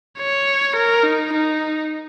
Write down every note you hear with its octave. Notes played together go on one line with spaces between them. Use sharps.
C#5
A#4
D#4
D#4